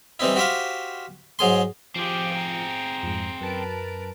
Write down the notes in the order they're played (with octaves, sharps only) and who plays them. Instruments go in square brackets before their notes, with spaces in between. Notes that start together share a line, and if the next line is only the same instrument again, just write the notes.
[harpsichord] E3 G3 C4 D#4 E4
F#4 G4 C5 E5 F5
G#2 F#3 G#4 C6
[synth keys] F3 F4 [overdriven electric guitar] C4 G#4 [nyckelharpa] G4 C5
[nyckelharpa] G5 A#5
[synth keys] F2 G#2
[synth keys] F#2 A5 D7 [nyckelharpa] A#4 B4